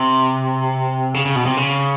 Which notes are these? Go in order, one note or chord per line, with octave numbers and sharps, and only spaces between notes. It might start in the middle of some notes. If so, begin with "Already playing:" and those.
Already playing: C3
C#3
C#3
B2
C3
C#3